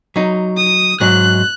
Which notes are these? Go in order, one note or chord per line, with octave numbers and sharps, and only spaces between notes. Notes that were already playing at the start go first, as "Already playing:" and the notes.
F#3 D#4
D#6
G#2 F#3 G#3 F#6